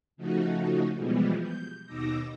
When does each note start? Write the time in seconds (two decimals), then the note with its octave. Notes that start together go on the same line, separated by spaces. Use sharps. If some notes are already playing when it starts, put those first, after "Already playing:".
0.17 C#3 F3 A3 D#4 F#4
0.97 B2 E3 F3 G3 G#3 B3
1.40 G6
1.86 D#2 B2 D#4 D6 E6 A#6